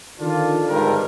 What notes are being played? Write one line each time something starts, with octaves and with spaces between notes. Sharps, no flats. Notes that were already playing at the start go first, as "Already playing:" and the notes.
D3 D#3 F3 D4 F4
G#1 G2 A#4